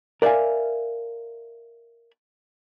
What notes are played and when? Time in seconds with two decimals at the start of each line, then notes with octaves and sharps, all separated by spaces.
0.22 A#4 D5 E5 F5 G#5